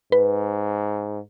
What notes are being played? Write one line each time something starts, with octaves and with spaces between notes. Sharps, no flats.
G#2 B4